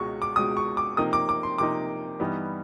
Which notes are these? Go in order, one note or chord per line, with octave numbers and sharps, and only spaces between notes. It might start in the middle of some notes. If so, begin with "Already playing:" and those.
Already playing: C#2 B2 G#3 C#6
D6
C#2 B2 G#3 D#6
C#6
D6
C3 F3 A#3 D#4 D#6
D6
D6
C6
C3 F3 A#3 D#4 D6
G2 E3 G3 B3 D#4